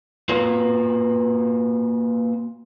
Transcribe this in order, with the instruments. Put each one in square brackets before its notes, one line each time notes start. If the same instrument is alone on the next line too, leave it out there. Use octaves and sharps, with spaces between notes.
[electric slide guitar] A#3 F4 F#4 B4